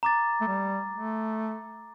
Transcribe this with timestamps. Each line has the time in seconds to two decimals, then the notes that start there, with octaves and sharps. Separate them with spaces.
0.03 A#5 D6 A6
0.41 A3
0.47 G3
0.94 A3